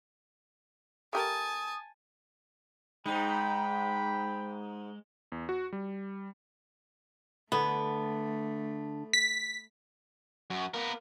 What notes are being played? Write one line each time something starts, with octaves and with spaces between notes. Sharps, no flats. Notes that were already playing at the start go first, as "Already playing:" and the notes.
A3 G4 A#4 G#5 A5 D#6
G#2 G#3 D#4 G5 B5
E2
F#4
G3
D3 A3 B3
B6
F#2 F#4
A#3 B3 A#4